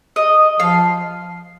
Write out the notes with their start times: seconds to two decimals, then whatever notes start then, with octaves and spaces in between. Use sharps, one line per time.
0.16 D#5
0.60 F3 F5